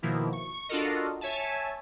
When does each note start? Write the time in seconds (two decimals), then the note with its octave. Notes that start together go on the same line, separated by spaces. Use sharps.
0.02 B2 D#3 F3 A#3 E4
0.33 C#6
0.69 D4 F4 F#4 A4 A#4 D#5
1.21 C#5 E5 G#5 A5